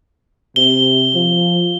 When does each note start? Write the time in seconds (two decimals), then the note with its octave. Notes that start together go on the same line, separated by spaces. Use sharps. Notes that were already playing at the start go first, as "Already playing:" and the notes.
0.56 C3 G7
1.15 F3